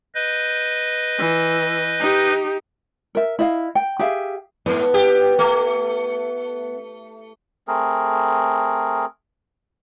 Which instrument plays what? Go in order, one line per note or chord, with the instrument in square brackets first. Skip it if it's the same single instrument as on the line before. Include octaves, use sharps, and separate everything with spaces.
[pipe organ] B4 D#5 G6
[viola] E3
D#4 G4
[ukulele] A#4 E5
E4 D#5 F5
G5
G4 G#4 E5 F5
[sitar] G#2 [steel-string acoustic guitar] B3
[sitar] G4
A3
[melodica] A3 C4 G#4 A#4